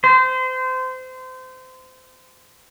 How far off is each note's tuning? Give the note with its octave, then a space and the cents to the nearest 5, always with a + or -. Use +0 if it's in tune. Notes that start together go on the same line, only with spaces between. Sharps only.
C5 -25